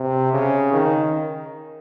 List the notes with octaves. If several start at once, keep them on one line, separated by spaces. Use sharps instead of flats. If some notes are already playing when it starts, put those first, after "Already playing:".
Already playing: C3
C#3
D#3